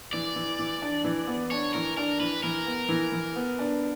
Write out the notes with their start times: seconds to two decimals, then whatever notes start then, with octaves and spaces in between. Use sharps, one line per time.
0.13 E3 D5
0.36 E3
0.59 E3
0.82 D4
1.04 E3
1.27 B3
1.51 D4 C#5
1.74 E3 A#4
1.97 D4 A#4
2.20 E3 B4
2.43 E3 A#4
2.67 B3
2.89 E3
3.12 E3
3.36 B3
3.59 D4